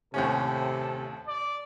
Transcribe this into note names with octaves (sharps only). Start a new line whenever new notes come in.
D#2 A2 C3 C#4 A4
D5